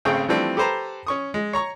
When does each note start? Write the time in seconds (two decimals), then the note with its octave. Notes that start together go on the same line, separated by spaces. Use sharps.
0.05 G#1 C#3 A3 C4 G#4 G5
0.29 E3 F3 G3 A3 C4 D4
0.57 G4 A4 B4 C5 A5 A#5
1.07 C#4 C#6 D#6
1.34 G#3
1.53 C#5 A#5 C#6